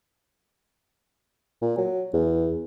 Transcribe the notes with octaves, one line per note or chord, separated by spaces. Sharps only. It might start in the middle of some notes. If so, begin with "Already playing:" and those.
A#2
F#3
E2